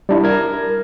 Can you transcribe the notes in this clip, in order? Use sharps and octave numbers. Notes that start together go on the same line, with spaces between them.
G3 D4 E4
A#4 G#6